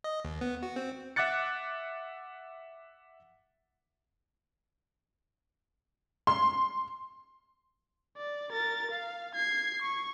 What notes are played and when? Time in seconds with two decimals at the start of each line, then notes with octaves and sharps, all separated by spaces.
0.04 D#5
0.25 D#2
0.41 B3
0.63 F#4
0.76 C4
1.16 E5 F#5 D6 F#6 A6 C#7
6.27 C6
8.17 D5
8.52 A#4 A6
8.91 F5
9.35 G#6 C7
9.82 C#6